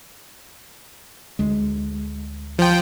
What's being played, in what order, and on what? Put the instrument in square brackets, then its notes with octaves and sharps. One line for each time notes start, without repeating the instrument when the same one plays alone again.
[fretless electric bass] D2 G#3
[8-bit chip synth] F3 G5